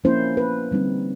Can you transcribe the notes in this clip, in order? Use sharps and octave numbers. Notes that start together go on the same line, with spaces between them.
F3 A#3 C#4 E4 C5
B4
D3 G3 C4 D#4